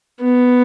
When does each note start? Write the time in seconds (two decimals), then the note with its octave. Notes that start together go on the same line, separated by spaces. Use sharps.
0.21 B3